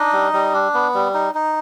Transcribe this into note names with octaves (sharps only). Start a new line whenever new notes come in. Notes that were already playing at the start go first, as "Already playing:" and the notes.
Already playing: D4 D#4 D#5
G3
G3
D4
B3
G3
D#4
D#4